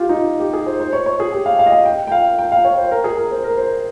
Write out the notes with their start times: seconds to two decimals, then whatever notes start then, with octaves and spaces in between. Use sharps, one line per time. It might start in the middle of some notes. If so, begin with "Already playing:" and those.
Already playing: F4 G4
0.09 D#4
0.40 G4
0.53 G#4
0.66 C5
0.80 C5
0.93 C#5
1.06 C#5
1.20 G#4
1.32 G4
1.46 F5
1.59 F5
1.66 D#5
1.72 F5
1.86 G5
2.07 G5
2.12 F5
2.39 G5
2.52 F5
2.65 C#5
2.78 C5
2.91 A#4
3.04 G#4
3.18 A#4
3.31 C5
3.44 A#4
3.57 C5